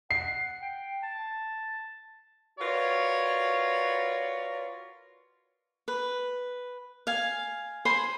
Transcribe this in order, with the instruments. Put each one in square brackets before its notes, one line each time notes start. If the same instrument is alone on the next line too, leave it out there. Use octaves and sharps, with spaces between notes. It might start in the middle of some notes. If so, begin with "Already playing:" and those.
[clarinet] F#5 [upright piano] C7
[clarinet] G5
A5
[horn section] F4 F#4 A#4 B4 C#5 D5
[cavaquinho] B4
F5 G#5
C5 G#5 B5 C6